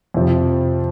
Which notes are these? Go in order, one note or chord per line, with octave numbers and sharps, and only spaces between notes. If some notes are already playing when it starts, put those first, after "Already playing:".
F2 C3 F3